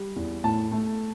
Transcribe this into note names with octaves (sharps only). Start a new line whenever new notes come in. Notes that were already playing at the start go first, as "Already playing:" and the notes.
Already playing: G3
E2
A2 A5
A3